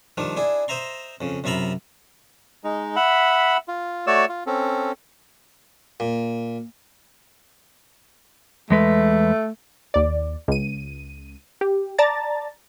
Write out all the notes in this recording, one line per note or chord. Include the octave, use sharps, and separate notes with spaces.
D#3 F3 G3 D4
D4 E4 G#4
C5 D#5 E5 A#5 C6
F2 C#3
F#2 C3 F4 E5 A#5 B5
G#3 D#4
E5 F#5 B5
F4
A3 F#4 C#5 D5 E6
F4
C4 C#4 A4
A#2
E2 G#3 A3 B4
D#2 D5
C#2 D#7
G4
D5 A5 A#5 A6